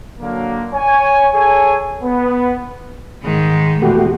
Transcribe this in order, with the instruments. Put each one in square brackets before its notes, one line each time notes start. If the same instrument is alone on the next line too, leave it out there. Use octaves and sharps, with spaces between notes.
[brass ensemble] D3 F#3 A#3
C#5 G#5
G#4 A4 C#5 G#5
B3
[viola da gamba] G#2 D#3 G#3
[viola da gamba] E2 B2 [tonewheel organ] A3 F#4 G4